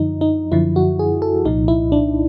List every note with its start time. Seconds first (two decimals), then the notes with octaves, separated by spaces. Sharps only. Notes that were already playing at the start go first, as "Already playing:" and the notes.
Already playing: F#2 D3 F3 D#4
0.21 D#4
0.52 F#2 D3 F3 E4
0.76 F#4
0.99 G#4
1.22 A4
1.45 C2 A#2 F3 D#4
1.68 E4
1.92 D4